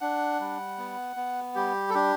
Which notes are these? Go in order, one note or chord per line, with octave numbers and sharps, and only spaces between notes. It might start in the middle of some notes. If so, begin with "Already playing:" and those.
D4 F#5
G3
B3
B3
G3 G4
A4
D4 G4